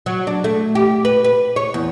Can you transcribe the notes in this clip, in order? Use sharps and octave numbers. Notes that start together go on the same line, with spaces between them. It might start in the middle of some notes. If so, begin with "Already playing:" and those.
F#3
D4
A3
G4
B4
B4
C#5
E2